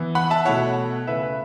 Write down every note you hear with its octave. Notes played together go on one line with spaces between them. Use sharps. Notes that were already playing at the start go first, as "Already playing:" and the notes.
Already playing: E3 B3 E4
F#5 B5
E5 A5
B2 A3 E4 C#5 F#5
C#3 A3 E4 B4 E5
B4